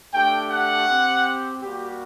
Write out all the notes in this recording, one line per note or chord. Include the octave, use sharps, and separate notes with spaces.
A3 D4 G4 G5
F#5
C4 G4
G3 A#3 F#4 G4